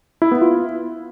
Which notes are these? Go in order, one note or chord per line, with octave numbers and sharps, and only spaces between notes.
E4
B3
F4